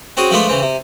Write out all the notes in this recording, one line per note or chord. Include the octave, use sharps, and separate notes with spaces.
C4 C#4 F#4 G#4
F3 G#3 A3 B3 D4 F4
C#3 E3 C4
C3